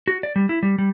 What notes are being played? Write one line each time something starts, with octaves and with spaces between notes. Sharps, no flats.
F#4
D5
G3
E4
G3
G3